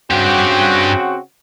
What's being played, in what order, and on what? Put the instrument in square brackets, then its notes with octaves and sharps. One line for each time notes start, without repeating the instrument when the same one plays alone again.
[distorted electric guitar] G2 G4 [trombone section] C#3 C4 F#4